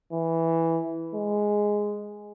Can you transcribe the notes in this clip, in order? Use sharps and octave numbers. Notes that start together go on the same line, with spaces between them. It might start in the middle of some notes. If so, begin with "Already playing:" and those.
E3
G#3